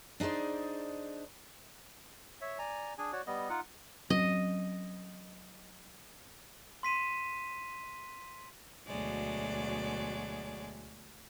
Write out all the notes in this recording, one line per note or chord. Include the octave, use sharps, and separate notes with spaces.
D4 D#4 G#4 C5 D5
C#5 E5
D5 G#5 A#5
D4 G#4 G#5
F#4 C#5 D5
G3 B3 D#5
D#4 F4 F#5
F#3 C4 C#4 D#5
C6 B6 D#7 E7
D2 B2 F#3 G#3 D5